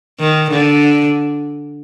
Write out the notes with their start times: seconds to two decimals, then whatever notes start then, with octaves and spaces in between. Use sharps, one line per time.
0.20 D#3
0.50 D3